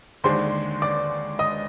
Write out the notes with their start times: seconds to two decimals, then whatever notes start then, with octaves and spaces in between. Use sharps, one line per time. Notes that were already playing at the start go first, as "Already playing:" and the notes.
0.24 D#2 D3 G#3 D4 C5 C6
0.82 D5 D6
1.39 D#5 D#6